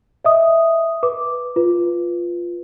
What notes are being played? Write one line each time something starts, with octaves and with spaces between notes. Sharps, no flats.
D#5 E5 D#6
B4 D6
F4 B4